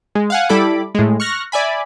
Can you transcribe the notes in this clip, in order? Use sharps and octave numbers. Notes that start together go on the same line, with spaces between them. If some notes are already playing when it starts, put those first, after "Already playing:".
G#3
F5 F#5 G#5
G3 E4 A4 B5 D6
A2 G#3
C#6 F6 F#6 A#6
D5 E5 G#5 B5